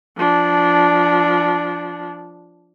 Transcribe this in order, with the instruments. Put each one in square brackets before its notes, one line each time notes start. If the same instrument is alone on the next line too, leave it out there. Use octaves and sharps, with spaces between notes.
[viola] F3 D4